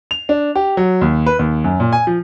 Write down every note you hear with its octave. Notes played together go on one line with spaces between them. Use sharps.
F7
D4
G4
F#3
D#2
B4
D#2
F#2
A#2
G#5
F3